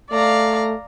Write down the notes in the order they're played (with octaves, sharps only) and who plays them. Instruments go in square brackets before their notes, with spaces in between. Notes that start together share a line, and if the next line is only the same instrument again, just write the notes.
[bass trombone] A3 [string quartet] D5 F5 A#5